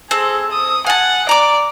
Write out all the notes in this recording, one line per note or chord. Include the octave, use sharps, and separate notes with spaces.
C4 G#4 A4
D#6
F#5 G#5 A5
D5 A#5 D6